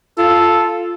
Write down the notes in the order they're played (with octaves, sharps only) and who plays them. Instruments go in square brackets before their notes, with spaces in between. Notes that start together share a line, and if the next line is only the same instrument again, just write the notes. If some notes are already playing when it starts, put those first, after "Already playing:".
[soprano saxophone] F4 [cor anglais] A4